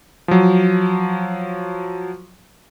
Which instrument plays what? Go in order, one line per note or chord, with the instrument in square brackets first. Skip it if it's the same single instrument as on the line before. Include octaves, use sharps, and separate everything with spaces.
[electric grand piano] F3 F#3